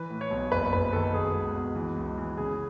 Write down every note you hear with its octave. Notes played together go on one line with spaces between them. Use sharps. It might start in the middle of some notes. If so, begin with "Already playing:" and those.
Already playing: E3 B4
A2
C#5
B1
F#1 B4
F#1 B4
D#3 A4
B2 G#4
C#2
B2
E3
C#2
E3
C#3 G#4